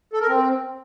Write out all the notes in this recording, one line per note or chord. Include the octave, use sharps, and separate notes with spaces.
A4
A#4
C4